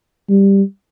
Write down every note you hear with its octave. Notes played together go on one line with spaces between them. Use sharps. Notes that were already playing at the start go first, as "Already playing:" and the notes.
G3